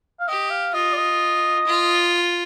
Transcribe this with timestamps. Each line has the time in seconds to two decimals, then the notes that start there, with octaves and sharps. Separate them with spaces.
0.20 F5
0.28 G4 D#5
0.51 F5
0.74 F4 D#5
0.93 D5
0.97 D#5
1.66 F4